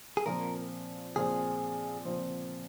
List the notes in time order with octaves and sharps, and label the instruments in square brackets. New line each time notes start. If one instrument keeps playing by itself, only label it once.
[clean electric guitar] G#4
[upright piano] A#2 F3 C4 [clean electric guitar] A#4
[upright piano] A#2 F3 C4 [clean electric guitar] G#4
[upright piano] A#2 F3 C4